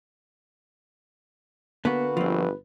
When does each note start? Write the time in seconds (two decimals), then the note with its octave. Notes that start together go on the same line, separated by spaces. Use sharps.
1.85 D3 A#3 B3 F#4 B4
2.17 G1 F3 C4